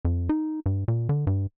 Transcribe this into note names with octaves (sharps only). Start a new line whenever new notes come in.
F2
D#4
G2
A#2
D3
G2